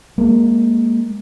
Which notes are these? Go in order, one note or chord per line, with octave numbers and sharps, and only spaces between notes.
G#3 A#3